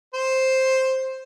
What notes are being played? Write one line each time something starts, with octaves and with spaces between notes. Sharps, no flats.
C5